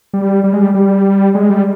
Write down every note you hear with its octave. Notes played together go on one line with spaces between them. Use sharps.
G3
G3
G#3
G3
G3
G#3
G3